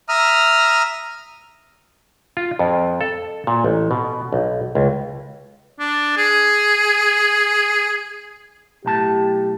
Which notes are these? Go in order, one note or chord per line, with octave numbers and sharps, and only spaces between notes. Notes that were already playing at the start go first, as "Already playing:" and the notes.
E5 A#5 D#6 F6
F4
F2
A4
A#2
A1
B2
B1
C#2
D4
G#4
B1 A2 G4 A5